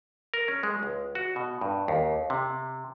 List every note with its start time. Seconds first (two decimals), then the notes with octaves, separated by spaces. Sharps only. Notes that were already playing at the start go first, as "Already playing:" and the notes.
0.34 A#4
0.48 C#4
0.63 G#3
0.83 C#2
1.15 F#4
1.36 B2
1.61 G2
1.88 D#2
2.30 C3